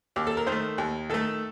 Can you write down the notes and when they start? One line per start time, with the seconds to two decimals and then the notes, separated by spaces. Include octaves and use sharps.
0.16 D#2 G4
0.27 A4
0.37 A#4
0.46 D#3 C5
0.52 A3
0.78 D#2
1.10 D#3 A3 A4